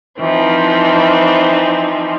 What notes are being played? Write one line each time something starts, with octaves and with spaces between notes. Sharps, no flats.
E3 F3 C4 D#4